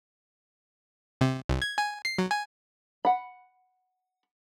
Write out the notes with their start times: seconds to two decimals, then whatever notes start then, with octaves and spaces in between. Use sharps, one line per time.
1.21 C3
1.49 C2
1.62 G#6
1.78 G#5
2.05 C7
2.18 F#3
2.31 G#5
3.05 F#5 B5